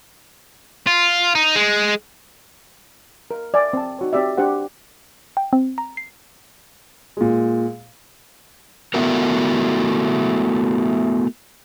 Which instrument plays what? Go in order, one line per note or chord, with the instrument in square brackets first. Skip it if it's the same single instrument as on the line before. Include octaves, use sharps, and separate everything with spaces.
[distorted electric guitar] F4
D#4
G#3
[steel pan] A#4
D5 E5 G#5
C4 A5
D#4 F#4 C#5
C4 G4 D5 E5
D4 G4 C5 F#5
[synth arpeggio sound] G5
C4
A#5
C7
[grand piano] A#2 G#3
[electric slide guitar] A3 B3 E4 F#4 A#4